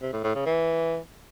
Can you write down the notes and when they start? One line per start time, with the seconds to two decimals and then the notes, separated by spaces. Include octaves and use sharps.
0.02 C3
0.13 A2
0.24 A2
0.35 C#3
0.46 E3